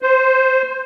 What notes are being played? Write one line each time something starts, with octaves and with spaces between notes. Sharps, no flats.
C5